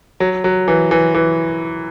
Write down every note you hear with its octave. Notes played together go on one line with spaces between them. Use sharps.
F#3
F#3
E3
E3
E3